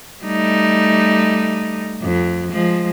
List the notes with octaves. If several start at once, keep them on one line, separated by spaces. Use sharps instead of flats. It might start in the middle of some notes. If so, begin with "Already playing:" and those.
G3 A3 D#4
F2
F3 G#3